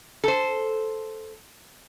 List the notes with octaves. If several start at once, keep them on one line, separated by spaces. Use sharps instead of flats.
A4 C5